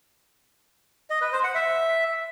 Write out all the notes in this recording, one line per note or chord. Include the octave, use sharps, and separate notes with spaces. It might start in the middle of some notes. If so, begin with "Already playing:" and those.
D#5
B4
C5
F#5
E5